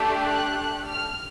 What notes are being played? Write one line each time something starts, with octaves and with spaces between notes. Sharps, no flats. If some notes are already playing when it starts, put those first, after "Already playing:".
Already playing: A3 D4 G4
F#6
F6